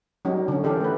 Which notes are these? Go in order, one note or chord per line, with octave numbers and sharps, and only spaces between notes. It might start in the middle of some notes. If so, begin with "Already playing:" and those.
F#3 G3 C#4 D#4
D3 C#4
E3 G4 A4 A#4
A3 B4